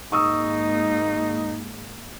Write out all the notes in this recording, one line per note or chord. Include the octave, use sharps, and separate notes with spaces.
G#1 G#3 A#3 D#4 C#6 D#6 E6